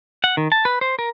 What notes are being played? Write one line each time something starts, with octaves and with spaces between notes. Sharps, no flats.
F#5
D#3
A5
B4
C5
A#4